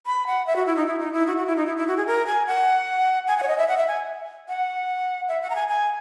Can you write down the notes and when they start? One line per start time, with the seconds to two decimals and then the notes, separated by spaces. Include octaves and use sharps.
0.06 B5
0.27 F#5
0.47 E5
0.56 F#4
0.67 E4
0.76 D#4
0.87 E4
1.00 D#4
1.13 E4
1.27 F#4
1.37 F#4
1.47 E4
1.56 D#4
1.67 E4
1.77 E4
1.88 F#4
1.97 G#4
2.07 A#4
2.27 G#5
2.47 F#5
3.28 G#5
3.38 F#5
3.43 C#5
3.48 D#5
3.58 E5
3.68 F#5
3.77 E5
3.88 G#5
4.49 F#5
5.28 E5
5.42 F#5
5.50 A#5
5.55 G#5
5.68 G#5